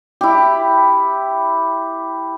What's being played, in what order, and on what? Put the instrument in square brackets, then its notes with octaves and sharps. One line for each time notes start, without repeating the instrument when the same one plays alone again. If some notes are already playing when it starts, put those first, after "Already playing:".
[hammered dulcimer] E4 G4